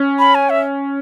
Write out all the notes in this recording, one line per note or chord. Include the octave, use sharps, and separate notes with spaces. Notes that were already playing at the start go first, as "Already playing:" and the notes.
Already playing: C#4
B5
G#5
E5